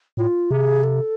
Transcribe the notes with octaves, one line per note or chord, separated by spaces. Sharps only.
A2 F4
C3 G#4
A4